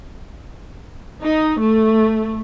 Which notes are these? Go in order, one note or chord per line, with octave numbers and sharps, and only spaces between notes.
D#4
A3